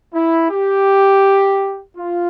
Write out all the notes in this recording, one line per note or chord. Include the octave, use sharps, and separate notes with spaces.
E4
G4
F4